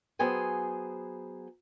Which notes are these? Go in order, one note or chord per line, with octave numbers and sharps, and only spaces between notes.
F#3 B3 G#4 C5 G5 G#5